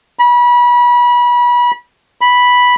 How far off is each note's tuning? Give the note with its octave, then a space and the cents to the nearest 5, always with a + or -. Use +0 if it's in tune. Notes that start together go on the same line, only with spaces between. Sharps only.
B5 -30
B5 -5